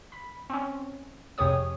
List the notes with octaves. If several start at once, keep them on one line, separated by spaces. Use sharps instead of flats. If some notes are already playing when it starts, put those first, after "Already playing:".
B5
C4 C#4
F2 C3 G4 G#4 C#5 D#6